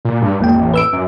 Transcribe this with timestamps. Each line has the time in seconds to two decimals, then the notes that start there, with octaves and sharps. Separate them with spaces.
0.05 A#2
0.22 G2
0.40 G#1 F2 A#3 G5
0.54 A1
0.74 B4 E6 D7
0.93 F#2